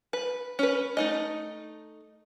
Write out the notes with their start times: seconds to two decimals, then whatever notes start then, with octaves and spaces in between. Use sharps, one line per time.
0.13 B4
0.59 C#4 B4
0.97 A3 D#4 D#5